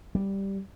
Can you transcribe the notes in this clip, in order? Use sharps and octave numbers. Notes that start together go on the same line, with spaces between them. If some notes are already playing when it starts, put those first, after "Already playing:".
G3